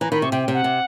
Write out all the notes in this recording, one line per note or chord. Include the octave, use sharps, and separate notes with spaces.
E3 A#5
D#3 B5
C3 C#6
C3 G5
G5
C3
F#5
C3